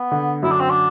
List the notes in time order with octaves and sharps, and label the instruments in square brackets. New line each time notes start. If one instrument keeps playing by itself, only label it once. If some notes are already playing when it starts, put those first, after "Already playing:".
Already playing: [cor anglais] B3
[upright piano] D3
[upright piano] F#2 [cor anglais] E4
[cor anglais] D4
C4
D4